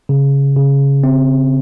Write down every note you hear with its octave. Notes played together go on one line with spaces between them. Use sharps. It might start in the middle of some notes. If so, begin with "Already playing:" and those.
C#3
C#3
C4